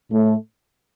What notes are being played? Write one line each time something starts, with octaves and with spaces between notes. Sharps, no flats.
A2 A3